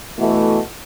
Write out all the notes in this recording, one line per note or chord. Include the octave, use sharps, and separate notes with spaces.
B2 E3 A3